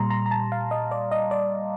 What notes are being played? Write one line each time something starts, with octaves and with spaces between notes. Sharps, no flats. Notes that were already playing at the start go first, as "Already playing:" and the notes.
Already playing: A#2 G3 A#5 C6
A#5
A#5
A5
F5
D#5
D5
D#5
D5